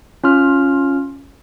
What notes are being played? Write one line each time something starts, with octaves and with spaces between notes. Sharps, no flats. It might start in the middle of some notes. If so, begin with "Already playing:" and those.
C#4 F4 F6